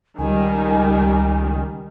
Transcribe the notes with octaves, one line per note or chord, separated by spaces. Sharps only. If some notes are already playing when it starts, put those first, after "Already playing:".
C#2 D#3 G3 G#5